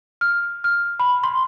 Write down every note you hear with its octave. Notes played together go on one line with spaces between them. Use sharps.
F6
F6
B5
C6